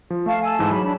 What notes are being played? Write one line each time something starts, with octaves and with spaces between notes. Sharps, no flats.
F3
A3 F5 A5 C#6
G#5 A5 E6
G#2 E3
F#3 G#4 C#5 B5
D4 B5